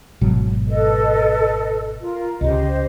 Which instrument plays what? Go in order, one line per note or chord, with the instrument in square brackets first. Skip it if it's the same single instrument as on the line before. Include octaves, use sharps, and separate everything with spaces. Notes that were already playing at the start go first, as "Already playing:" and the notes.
[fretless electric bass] G#1 B2 F#3
[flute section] A4 B4 D#5
F4 A#4
[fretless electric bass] C#2 C#3 [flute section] G4 C5 D#5